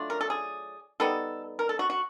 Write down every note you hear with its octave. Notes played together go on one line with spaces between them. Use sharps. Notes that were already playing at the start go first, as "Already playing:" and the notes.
Already playing: F#3 A3 D4 F4
A#4
A4
G#4
G3 B3 D#4 A4
A#4
A4
F#4
F#4